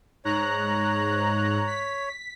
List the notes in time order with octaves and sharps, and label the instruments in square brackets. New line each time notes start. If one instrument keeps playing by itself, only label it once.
[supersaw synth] G#2 A#5 F#6 [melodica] C#5
[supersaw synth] B6